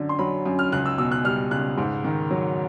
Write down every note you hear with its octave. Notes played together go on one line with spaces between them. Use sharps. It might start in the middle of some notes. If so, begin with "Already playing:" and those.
Already playing: F#2 D3
C6
F#3 B5
F#2
F6
C#2 F#6
E6
B2 E6
F#6
G3 F6
C#2 F#6
G#2
D#3
F#3